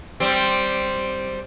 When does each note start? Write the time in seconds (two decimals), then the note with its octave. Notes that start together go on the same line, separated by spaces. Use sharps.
0.20 G3 C4